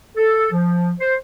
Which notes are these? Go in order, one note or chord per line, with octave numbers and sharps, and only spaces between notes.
A4
F3
C5